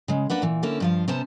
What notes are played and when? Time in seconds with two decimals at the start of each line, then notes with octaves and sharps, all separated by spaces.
0.08 C#3 G#3
0.30 A#3 D4 B4 F#5
0.42 A#2 E3
0.63 D3 A#3 C#4 E4
0.80 G2 F3 F5
1.08 C3 B3 C#4 C5 A5